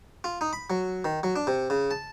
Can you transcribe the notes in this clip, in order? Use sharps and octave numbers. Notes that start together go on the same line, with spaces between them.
F4
D#4
B5
F#3
D#3
F#3
D4
C3
C#3
A5